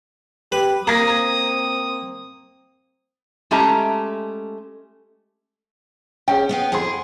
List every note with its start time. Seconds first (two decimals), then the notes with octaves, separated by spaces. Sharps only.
0.52 G4 B4
0.87 A#3 C4 A#5 D#6 G#6 A#6
3.51 G#3 A3 C#4 G4 A5 A#5
6.28 C#4 G#4 G5
6.49 B3 E5 F5
6.72 F2 E4 G#4 G#5 C6